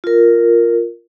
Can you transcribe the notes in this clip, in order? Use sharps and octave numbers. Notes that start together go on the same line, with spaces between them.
F4 A#4